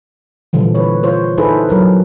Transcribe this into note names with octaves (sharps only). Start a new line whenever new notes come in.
A#2 D3 E3 F3 G3
B4 C#5
F4 C5 C#5
D#4 E4 G#4 A4 B4 C5
F#3 A#4 B4